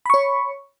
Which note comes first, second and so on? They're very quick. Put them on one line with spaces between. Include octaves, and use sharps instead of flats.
B5 C#6 C#5